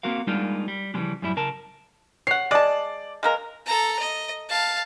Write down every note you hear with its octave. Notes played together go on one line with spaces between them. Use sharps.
A#3 C4 F#4 A#4 F5
G3 G#3 A#3 D4 D#4 F4
G3
C#3 E3 F3 G3 G#3 D4
F#2 A2 G3 E4
C#3 A#4 A5
C#5 F#5 C7
G#3 D5 A5
G#3 A#3 A#4
A4 A#5
D#5
F5 A5